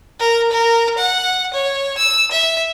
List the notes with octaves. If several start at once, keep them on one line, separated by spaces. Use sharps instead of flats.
A#4
A#4
F#5
C#5
E6
E5